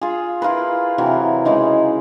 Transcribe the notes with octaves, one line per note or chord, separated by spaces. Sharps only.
F4 G#4
E4 F4 A#4 B4
C3 E3 F#3
C#3 E3 G#3 D#4